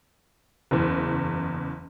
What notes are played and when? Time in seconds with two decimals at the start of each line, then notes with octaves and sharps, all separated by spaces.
0.71 F#1 E2